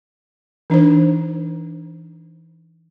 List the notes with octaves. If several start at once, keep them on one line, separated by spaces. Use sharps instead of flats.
E3 D4 D#4 C5